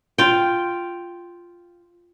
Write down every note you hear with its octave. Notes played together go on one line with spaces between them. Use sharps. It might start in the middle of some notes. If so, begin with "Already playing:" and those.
F4 G5